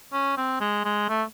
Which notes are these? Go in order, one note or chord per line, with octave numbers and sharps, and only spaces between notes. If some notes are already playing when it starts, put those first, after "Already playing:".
C#4
C4
G#3
G#3
A3